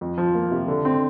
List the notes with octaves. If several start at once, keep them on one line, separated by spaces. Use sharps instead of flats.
F2
F3
A#3
C3
D3
C4